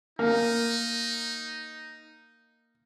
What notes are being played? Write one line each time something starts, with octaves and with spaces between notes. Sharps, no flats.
A#3 D#4